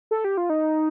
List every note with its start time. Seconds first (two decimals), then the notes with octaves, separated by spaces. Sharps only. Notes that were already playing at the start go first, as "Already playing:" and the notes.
0.11 A4
0.24 G4
0.37 F4
0.50 D#4